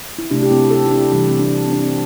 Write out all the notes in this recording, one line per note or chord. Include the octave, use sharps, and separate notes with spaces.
E4
C3 A3 D4 G4
G4
C4 E4
E4 A4
E4
D4 G4
C3 E3 G3 D4 G4
C4
D4
C4
D4
C4